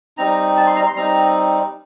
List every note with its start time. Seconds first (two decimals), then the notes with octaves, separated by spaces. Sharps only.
0.18 G3 C4 D#4 A#5
0.57 A5
0.67 C6
0.76 A#5
0.87 C6
0.95 G3 C4 D#4 A#5